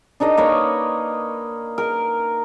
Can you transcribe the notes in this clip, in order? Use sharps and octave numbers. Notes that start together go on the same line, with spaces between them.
D4 D#4 A#4 D#5
A#3 A#4 B4 C#5
A#4